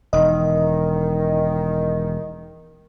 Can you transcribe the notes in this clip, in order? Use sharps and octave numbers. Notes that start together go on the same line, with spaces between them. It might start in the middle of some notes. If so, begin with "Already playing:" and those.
E1 D#3 D#5